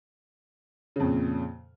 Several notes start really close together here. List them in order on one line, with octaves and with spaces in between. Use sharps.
C#3 F2 A#2